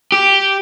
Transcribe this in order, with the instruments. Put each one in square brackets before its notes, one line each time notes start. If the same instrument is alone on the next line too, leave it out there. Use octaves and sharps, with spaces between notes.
[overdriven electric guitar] G4